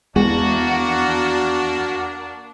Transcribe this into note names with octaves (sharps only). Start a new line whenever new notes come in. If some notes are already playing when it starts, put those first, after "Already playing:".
E2 G#3 A#3 D4 F#4